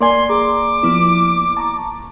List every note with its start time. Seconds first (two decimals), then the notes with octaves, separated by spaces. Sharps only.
0.01 A#3 D5 G#5 C6
0.29 G#4 A#5 C6 D6
0.83 F3 B3 E4
1.57 A5 A#5 C#6